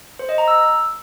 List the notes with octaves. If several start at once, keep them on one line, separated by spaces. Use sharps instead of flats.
C5
D#5
A#5
E6